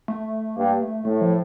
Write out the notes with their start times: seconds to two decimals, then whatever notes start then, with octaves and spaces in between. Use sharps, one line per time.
0.08 A3
0.56 G2 A#3
0.81 A3
1.05 A2 A3
1.21 F3